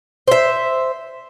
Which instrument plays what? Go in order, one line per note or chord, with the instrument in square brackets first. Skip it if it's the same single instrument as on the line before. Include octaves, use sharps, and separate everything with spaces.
[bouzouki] C5 E5